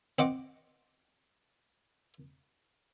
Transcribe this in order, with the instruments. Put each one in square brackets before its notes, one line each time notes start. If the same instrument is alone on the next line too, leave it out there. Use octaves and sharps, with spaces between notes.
[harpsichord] C4 D#5 F#5 D6